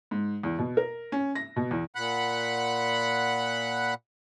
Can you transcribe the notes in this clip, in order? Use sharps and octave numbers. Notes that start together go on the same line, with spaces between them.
G#2
E2
B2
A#4
C#4
A#6
B2
E2
A#2 F#5 B5 F#6